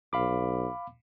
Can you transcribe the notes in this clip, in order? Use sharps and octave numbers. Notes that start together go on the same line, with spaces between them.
B1 F5 B5 D6